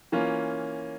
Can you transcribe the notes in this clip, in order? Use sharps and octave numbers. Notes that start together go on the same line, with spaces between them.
E3 A#3 C#4 F4